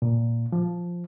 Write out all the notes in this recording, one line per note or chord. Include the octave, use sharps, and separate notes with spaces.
A#2
F3